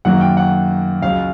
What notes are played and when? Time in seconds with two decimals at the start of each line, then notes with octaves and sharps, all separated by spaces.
0.05 F#2 D#3 F#3 A#3 F#5
0.21 G5
0.37 F#5
1.01 C#2 C#3 F#3 F5